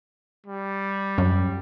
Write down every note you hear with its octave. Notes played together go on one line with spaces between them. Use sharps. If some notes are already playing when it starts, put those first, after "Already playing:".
G3
F#2